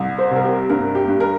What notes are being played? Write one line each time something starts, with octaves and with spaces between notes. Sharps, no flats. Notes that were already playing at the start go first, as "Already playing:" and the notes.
Already playing: C2
C5
C3 A#4
G4
G2 A#4
G4
G2
A#4